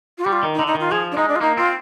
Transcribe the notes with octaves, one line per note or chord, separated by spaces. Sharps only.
F4
G3 G4
F4
D#3
D#4
D3
D#4
D#3
F4
F3 G#4
D4
G#3 D#4
D4
F4
A#3 D#4
C4 F4